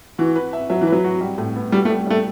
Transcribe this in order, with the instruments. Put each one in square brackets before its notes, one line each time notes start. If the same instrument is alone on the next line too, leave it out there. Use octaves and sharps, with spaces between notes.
[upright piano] E3 [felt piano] F#4
[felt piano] B4
E5
[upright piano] F#3 [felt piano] E5
[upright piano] E3
[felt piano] B4
[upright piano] F#3
[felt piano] F#4
G3
A2
B3
[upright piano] G3 [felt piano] F#4
[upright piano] A3
[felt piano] G3
[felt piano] G3 [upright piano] A3